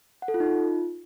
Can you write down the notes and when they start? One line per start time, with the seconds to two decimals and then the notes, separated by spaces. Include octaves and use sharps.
0.22 F#5
0.28 A4
0.34 F4
0.40 D#4
0.46 F4